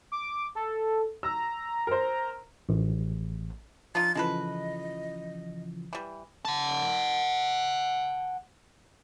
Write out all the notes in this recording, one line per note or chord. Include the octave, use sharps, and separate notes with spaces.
D6
A4
A#5 E6
A#4 C5
A1
F3 D4 D#4 F4 A6
C#3 E3 F3 G#3 A4 B4 D#5
E3 G3
F#5 A5